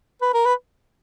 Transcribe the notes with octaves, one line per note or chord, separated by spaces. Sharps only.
B4
A#4
B4